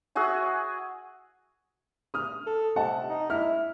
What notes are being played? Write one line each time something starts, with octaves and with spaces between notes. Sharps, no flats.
F#4 G#4 E5
D#6 F6
A4
C3 D#5 F#5 A5
D#4
E4 F6